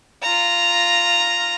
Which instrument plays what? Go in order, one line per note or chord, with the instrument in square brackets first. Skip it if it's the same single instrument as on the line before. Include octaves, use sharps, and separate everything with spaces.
[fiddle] F4 A#5